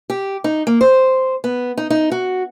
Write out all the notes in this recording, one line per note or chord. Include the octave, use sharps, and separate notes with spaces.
G4
D#4
A#3
C5
B3
D#4
D#4
F#4